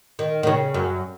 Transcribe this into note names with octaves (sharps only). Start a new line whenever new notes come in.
D#3
D#3
C#3
F#2